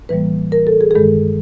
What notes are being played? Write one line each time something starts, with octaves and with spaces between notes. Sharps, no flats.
A2 E3 G3 A#3 B4
A#4
A4
G#4
G#4
G2 D#3 G#3 A4